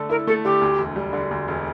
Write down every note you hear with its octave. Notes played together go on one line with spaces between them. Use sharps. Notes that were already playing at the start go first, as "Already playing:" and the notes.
Already playing: D3 A3 A4
E4 A#4
A3 A4
D3 G4
D2
E1
G3
D3
D2
E1